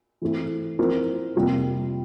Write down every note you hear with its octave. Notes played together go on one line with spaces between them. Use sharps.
E3 A3 C4 E4
F3 C4 E4 A#4
F2 C3 G3 A#3 F4